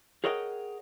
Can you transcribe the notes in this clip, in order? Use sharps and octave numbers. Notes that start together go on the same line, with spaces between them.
G#4 A#4 C#5 D#5 F#5 G5